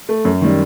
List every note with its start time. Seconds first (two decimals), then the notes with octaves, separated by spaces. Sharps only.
0.09 A3
0.25 F#2
0.41 D#3 G3